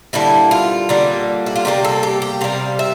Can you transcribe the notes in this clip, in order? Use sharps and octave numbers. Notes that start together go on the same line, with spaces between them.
D3 G3 A#3 E4
F4
D3 G3 A#3
E4
F4
C3 G3 A#3 G4
A4
G4
G4
C3 G3 A#3 F5
E5